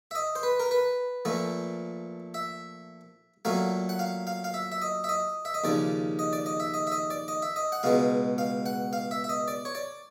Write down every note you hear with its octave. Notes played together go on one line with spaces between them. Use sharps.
E5
D#5
C5
B4
A#4
B4
A#2 F3 A3
E5
A#2 F#3 A3 F5
F#5
F5
F5
F5
E5
E5
D#5
E5
D#5
E5
D#5
D#2 C#3 F3 D5
D#5
D5
D#5
E5
D#5
E5
D#5
D5
D#5
E5
D#5
F#5
C#2 B2 G#3 F5
F5
F#5
F5
E5
E5
D#5
D5
C#5
D5